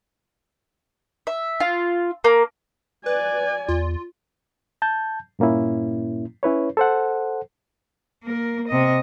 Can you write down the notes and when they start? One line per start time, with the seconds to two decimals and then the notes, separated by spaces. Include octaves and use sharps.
1.27 E5
1.60 F4
2.24 A#3
3.06 B4 D5 G#5
3.68 E2 F4
4.82 A5 G6
5.39 G2 A#2 A#3 C#4 E4
6.43 C#4 E4 B4 C#5
6.77 A4 C5 F#5
8.23 A#3 A#4
8.68 C3 D#5